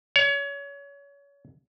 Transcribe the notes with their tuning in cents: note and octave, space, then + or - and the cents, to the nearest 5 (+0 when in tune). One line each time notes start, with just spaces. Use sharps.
C#5 +30